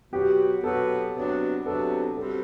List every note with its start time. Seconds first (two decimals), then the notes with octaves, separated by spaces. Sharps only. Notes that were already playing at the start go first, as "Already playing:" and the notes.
0.13 B2 F#3 B3 F#4 G4
0.63 B2 F#3 B3 F#4 A4
1.15 C3 F#3 B3 D4 F#4
1.66 C3 F#3 B3 D4 F#4 A4
2.17 G3 C4 F#4 A4